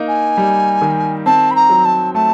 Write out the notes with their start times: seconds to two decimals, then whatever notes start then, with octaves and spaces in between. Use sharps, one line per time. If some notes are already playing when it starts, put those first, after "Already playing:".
Already playing: A#3 D#4
0.08 G#5
0.37 G3
0.82 D#3
1.26 C4 A5
1.51 B5
1.55 A#5
1.70 F#3
1.85 A5
2.14 A3 A5